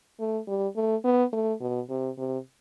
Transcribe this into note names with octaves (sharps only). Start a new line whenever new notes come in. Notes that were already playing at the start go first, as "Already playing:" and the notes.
A3
G3
A3
B3
A3
B2
C3
C3